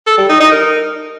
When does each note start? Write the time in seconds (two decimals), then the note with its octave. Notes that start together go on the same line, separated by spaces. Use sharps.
0.07 A4
0.18 G3
0.29 D#4
0.40 D#4
0.52 A#4